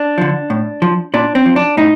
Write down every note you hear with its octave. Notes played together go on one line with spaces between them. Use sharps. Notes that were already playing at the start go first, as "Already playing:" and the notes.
Already playing: D4
D3 F3
A2
F3
A#2 D4
C4
F3
D4
A2 D#4